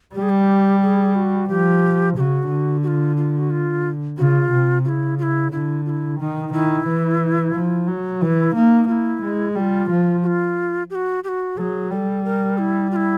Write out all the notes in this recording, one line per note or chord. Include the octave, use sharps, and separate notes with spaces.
G3 G4
G#4
G4
G#4
F#4
F3 G4
C#3 F#4 G4
D3
F#4
F4
F4
F#4
F4
C#3 F4 F#4
C3
C#3 E4 F4
F4
E4
D3 E4
F4
E4
D#3 D#4
D#3 E4
E3
F3
F#3
E3 E4
A#3 D#4
A#3 E4 F4
G#3
G3 F4 F#4
F3
F#4
F4
G4
F#4
G4
F#4
F#3 G#4 A4
G3 A4
A#4
E4
F4
E4